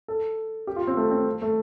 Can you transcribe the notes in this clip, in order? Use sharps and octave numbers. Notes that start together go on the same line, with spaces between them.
A4
G4
F4
C4
A3
C4
A3